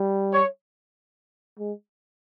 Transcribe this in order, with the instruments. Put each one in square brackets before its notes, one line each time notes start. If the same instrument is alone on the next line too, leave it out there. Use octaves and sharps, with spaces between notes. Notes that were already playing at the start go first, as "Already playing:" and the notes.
Already playing: [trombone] G3
[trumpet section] C#5
[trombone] G#3